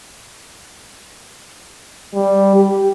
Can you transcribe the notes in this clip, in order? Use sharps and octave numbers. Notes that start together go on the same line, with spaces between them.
G3
G4